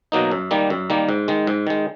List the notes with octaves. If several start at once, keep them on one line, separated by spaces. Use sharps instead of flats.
B2 F#3 A#3 D#4
F#2
D#3 G3 A#3
F#2
D#3 G3 A#3
G#2
D#3 G#3
G#2
D#3 G#3